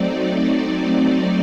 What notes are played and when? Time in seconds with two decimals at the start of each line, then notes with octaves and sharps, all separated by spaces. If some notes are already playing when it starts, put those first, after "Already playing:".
Already playing: F#3 A3 C4 D#4 D5
0.50 D5